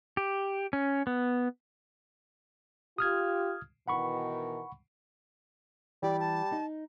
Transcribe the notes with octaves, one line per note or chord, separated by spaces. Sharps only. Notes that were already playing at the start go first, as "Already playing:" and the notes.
G4
C#4
B3
F4 G4 D#6 F6 G#6
B2 D#3 E3 F#5 B5 C#6
E3 G3 G4 D5
A5
D#4